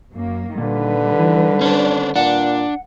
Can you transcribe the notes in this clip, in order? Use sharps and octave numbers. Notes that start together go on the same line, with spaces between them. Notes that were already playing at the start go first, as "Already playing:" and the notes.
F#2 A#3
A#2 D3 D#3 G3 B4
E3
C#4 D4 C5
A#2 D4 F#5